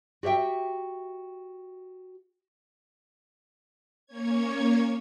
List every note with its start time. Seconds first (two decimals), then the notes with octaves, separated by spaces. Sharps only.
0.23 F#4 G4 C#5 E5 G5
4.06 A#3 C#4 C#5 G#6